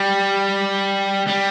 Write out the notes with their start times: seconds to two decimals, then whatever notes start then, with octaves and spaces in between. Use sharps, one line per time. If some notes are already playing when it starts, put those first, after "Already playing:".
Already playing: G3
1.27 G3